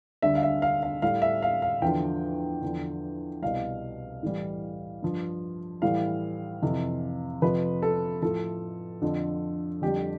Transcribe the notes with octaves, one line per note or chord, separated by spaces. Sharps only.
D2 D3 G3 E5
F5
E5
F5
F5
A2 G3 F5
E5
F5
F5
E2 D3 F3 G5
E2 D3 F3
C2 B2 G3 F5
A2 E3 G3
G2 F3
A2 E3 G3 F5
F2 C3 E3
F2 C3 F3 B4
A4
A2 F3 A4
F2 D3 F3
F2 D3 G3 G4